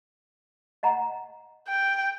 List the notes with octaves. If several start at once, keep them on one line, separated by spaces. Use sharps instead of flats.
D#5 F#5 A#5
G5